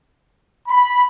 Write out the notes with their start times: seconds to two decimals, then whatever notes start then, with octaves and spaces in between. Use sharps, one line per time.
0.65 B5